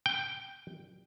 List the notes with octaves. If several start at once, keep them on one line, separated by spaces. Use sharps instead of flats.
G5